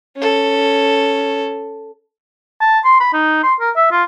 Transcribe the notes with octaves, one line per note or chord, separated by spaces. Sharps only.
C#4 A4
A5
C6
B5
D#4
C6
A#4
E5
F4